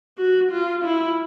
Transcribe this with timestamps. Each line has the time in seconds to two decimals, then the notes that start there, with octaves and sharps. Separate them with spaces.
0.18 F#4
0.52 F4
0.85 E4